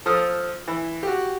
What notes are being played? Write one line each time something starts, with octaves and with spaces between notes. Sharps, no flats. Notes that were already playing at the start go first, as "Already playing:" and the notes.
F3 A4 D#6 F6
E3
F#4 G4